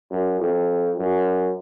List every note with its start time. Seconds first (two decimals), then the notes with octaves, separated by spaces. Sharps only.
0.11 F#2
0.40 F2
0.98 F#2